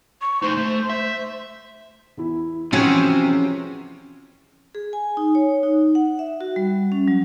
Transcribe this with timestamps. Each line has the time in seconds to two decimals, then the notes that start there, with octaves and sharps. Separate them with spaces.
0.21 C#6
0.42 A3 D#4 C5
0.57 A3
0.90 E5
2.17 E2 E4
2.73 C3 E3 F3 C#4 E4 F#4 G#4
4.75 G#4
4.93 G#5
5.17 D#4
5.35 C#5
5.63 D#4
5.95 F#5
6.19 E5
6.41 F#4
6.56 G3
6.92 C#4
7.08 F#3